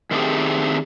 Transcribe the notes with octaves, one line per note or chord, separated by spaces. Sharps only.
D#3 A3 C4 D4 G4 G#4